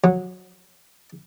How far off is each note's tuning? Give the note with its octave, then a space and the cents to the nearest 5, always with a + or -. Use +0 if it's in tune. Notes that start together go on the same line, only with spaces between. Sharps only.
F#3 -15